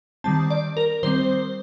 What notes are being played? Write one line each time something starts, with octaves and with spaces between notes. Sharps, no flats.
D#3 G3 C4 A5
D5
A#4
D#3 G3 C4 C5